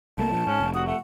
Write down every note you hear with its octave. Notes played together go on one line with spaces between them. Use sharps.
C2 A3 A#3 A5
A#2 F3
G#2 C#4
F1
F#4 D#6
A3 F#5